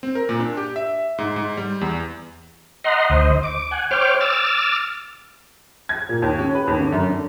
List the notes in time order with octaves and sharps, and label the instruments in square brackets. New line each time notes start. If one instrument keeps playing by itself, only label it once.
[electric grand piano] C4
A#4
A#2
D4
G4
E5
G#2
G#2
G3
E2
[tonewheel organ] D#5 F#5 A#5 C6
D2 C5 D#5
D6
F#5 G#5
C5 C#5 G5 D6 F6
D6 E6 F6 A6
[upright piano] G#6
A#2
D#2
C#4
B4
D#2
D3
F#2
D3